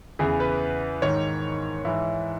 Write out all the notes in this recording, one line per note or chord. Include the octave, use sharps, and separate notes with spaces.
E2 C#3 E3 G#4
B4
G#2 D#3 C#5
G#2 E3 E4